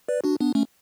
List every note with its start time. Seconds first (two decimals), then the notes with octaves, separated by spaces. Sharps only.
0.08 B4 D5
0.24 D4 F#4
0.40 B3 D4
0.55 A3 C#4